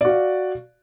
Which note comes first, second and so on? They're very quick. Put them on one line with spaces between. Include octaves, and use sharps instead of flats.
D5 F#4 F5